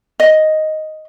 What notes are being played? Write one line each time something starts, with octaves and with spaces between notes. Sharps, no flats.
D#5